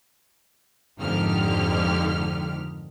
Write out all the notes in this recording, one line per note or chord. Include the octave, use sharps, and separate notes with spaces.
F2 G#2 D3 D#3 G4 F6